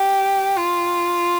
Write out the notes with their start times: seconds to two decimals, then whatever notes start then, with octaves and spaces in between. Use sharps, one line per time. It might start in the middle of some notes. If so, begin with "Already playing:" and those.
Already playing: G4
0.56 F4